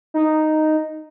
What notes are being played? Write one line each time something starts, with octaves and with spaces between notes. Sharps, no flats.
D#4